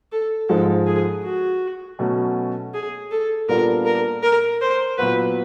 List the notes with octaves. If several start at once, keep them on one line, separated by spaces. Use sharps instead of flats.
A4
G#2 F3 G#3 A4
G#4
F#4
B2 F#3 A3 C#4
G#4
A4
A#2 G3 B3 D4 F4 A#4
A#4
A#4
C5
A#2 F#3 B3 B4